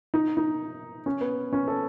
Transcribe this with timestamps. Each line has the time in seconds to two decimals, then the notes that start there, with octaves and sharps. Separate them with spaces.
0.14 D#4
0.37 D#4
1.06 C#4
1.21 B3
1.53 C#4
1.68 A4